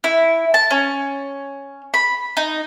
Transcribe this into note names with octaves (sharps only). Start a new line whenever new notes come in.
E4
A5
C#4
B5
D#4